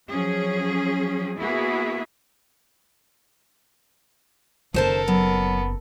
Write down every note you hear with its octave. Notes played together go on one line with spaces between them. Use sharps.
F3 F#3 C#4 G#4
A#3 B3 E4 F#4 G#4
F#1 D#2 A4 A#4 C5 A5
F#3 B3